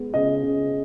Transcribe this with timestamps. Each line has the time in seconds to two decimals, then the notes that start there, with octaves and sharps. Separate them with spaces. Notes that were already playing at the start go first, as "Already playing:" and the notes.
Already playing: G#3 B3
0.14 C#3 D#5
0.43 C#3